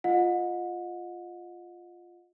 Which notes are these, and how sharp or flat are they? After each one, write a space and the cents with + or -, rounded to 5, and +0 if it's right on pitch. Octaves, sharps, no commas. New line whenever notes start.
F4 +0 D#5 +0 F#5 -35